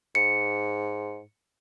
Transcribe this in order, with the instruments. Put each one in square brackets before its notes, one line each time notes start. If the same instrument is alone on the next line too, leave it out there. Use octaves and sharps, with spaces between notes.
[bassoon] G#2 [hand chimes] C#7